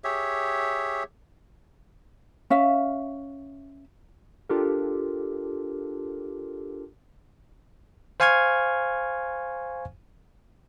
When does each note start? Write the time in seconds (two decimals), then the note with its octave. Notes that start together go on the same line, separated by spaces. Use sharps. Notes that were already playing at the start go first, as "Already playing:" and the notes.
0.04 G4 G#4 C#5 E5
2.50 C#4 E5 F5
4.49 D4 F4 G4 A4 A#4
8.20 C5 F5 G#5 C#6 F6 G#6